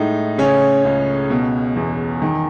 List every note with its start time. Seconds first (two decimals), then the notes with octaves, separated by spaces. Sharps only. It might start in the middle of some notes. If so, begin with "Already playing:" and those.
Already playing: A2 G#3 D#4
0.38 C#3 C#4 C#5
0.85 C#2
1.30 B2
1.76 E2
2.22 D#3